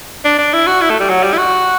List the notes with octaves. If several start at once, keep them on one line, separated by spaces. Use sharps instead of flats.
D4
D4
E4
F#4
E4
A3
G3
F#3
G3
E4
F#4